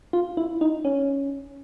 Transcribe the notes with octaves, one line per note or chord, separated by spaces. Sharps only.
F4
E4
D#4
C#4